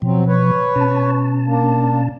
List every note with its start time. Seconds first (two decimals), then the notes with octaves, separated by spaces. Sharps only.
0.02 B2 F3 F#3 C4
0.27 B4 C#5
0.76 B2 C#4 A5
1.46 A#3 D4